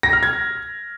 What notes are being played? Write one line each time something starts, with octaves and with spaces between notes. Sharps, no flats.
A#6
F6
G#6